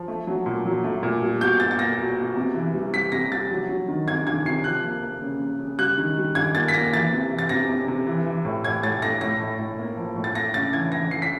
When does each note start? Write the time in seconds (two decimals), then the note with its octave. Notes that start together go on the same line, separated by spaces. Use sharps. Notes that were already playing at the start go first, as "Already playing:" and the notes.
Already playing: F3
0.08 A3
0.27 F#3
0.46 A#2
0.65 F#3
0.84 A3
1.03 A#2
1.22 G3
1.41 B2 G6
1.60 B2 A6
1.71 A6
1.79 A#3 A#6
1.98 B2
2.18 B2
2.36 C3
2.55 E3
2.74 G3
2.93 G3 B6
3.12 C3 A#6
3.31 G3 A6
3.50 F#3
3.69 F#3
3.88 D#3
4.08 C3 G#6
4.27 D#3 G#6
4.45 C3 C7
4.64 F3 F#6
4.84 A#3
5.03 A#3
5.22 C#3
5.41 C#3
5.60 C#3
5.79 G3 F#6
5.97 D#3
6.17 G3
6.35 D#3 G#6
6.55 A#3 A6
6.68 B6
6.74 A#3 A#6
6.93 E3 A6
7.13 C3
7.31 E3
7.39 A6
7.49 C3 A#6
7.69 C3
7.88 C3
8.06 E3
8.26 E3
8.45 A2
8.64 A2 G#6
8.83 A2 A6
9.02 A3 A#6
9.21 A2 A#6
9.40 A2
9.59 A2
9.78 A#3
9.97 F3
10.16 A2
10.24 A6
10.35 A3 A#6
10.54 C#3 A6
10.73 E3 G#6
10.92 E3 A#6
11.11 E3 C7
11.22 B6